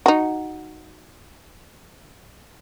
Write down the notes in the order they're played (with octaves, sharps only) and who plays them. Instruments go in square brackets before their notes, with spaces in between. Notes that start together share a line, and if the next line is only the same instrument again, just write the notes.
[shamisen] D#4 F#4